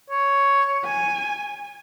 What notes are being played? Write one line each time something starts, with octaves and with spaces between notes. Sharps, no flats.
C#5
G#5